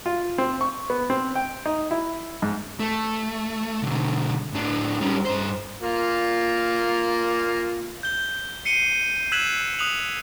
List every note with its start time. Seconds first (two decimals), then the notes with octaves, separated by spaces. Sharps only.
0.06 F4
0.38 C4
0.61 C#6
0.90 B3
1.10 C4
1.35 G5
1.66 D#4
1.91 E4
2.42 G#2
2.80 A3
3.83 B1 D3
4.54 A2 D4
5.01 G3 C#4
5.25 G2 C5
5.82 A#3 F4
8.03 G6 G7
8.65 C7 C#7 D#7 G7
9.32 E6 F#6 G#6 B6 E7 F#7
9.79 D#6 F#6 F7 F#7